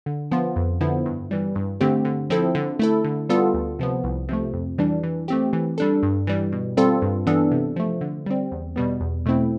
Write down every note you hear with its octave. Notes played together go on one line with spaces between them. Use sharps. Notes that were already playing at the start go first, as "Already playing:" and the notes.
D3
F3 B3 F4
F2
D3 F3 B3 E4
G2
E3 G3
G2
D3 A3 C4 G4
D3
F3 C4 E4 A4
D3
A3 E4 A4
D3
G3 B3 F4 A4
D2
C3 F3 B3
C2
C3 F3 A3
F2
E3 G3 D4
E3
A3 C4 G4
E3
G3 D4 A4
G2
E3 G3
B2
G3 C4 F4 A4
G2
E3 B3 D4 A4
C3
F3 A3
D3
G3 C4
E2
B2 G3 B3
E2
B2 A3 C4 E4